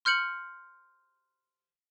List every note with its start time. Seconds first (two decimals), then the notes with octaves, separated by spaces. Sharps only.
0.05 C6 F6 G6 C#7 F#7